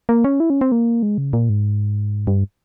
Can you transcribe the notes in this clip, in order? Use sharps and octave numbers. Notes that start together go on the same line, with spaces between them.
A#3
C#4
E4
C#4
C4
A#3
G#3
C#3
A#2
G#2
G2